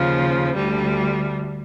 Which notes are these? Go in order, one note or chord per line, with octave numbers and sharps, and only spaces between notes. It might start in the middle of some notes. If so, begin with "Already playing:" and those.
Already playing: D#2 C#3 F3
D2 D3 G3